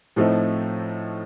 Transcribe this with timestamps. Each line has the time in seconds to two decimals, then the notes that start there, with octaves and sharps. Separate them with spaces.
0.16 A2 F3 A3 C4 D#4